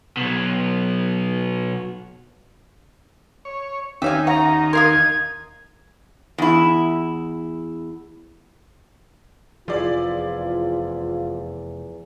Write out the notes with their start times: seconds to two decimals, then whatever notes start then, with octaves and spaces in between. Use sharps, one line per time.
0.17 B2 F#3
3.45 C#5
4.02 D#2 C#4 D#4 C#5 E5 F5 G#5
4.27 C#5 E5 F#5 A#5
4.73 A#4 F5 C6 D#6 G#6
6.38 E2 E4
9.68 F1 E2 F3 E4 F4 G#4 D5